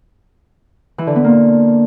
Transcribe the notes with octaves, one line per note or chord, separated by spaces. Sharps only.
E3
D3
B3
A#3